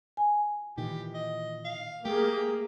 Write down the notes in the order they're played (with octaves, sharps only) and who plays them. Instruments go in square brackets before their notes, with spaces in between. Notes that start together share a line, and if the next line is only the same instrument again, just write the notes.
[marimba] G#5
[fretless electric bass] A#2 D#3 E3 [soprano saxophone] G4
[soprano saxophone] D#5
F5
[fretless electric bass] A3 [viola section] A#3 G#4 [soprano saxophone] G4